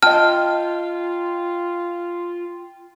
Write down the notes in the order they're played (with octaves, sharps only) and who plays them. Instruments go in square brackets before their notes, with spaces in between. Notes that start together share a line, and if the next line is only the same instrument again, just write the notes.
[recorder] F4 [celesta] D#5 A5 [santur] G5 [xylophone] F6